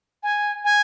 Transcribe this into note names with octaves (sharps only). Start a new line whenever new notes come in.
G#5
G#5